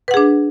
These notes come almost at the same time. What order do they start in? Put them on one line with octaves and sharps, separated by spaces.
B4 F#5 G#4 D4